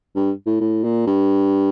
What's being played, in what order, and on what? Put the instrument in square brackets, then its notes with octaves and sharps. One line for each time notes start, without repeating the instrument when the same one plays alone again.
[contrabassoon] G2
A2
A2
A#2
G2